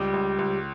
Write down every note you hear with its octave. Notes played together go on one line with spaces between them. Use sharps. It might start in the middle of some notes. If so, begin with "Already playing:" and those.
Already playing: C#2 G3 G4
C#2
C#2